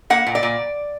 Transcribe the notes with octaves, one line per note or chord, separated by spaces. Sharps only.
A#3 F#5
A#2
D5
A#2